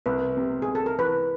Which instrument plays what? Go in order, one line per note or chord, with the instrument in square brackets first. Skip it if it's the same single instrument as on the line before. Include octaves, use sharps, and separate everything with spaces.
[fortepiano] C2 [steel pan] B4
[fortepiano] C3
[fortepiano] C2 [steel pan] G#4
[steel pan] A4
A#4
[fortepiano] E3 [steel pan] B4